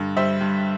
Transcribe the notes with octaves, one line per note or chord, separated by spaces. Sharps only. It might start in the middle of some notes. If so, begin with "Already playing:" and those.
Already playing: G2 D3
G3 C5 E5
G2